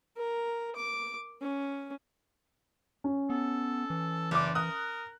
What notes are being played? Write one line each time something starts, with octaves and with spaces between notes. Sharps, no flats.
A#4
D6
C#4
C#4
B3 A4
E3
F#1 D5 D6
A#4 D#6 F#6